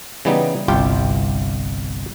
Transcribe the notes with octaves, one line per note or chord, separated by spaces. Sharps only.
C#3 E3 G3 B3 D#4
G1 C2 F4 G4 G5